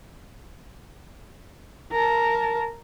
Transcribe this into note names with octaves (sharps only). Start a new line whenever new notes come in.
A#4 A5